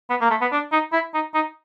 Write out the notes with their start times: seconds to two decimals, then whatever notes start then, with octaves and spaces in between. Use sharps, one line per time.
0.10 B3
0.21 A#3
0.30 A3
0.41 B3
0.52 D4
0.72 D#4
0.93 E4
1.14 D#4
1.34 D#4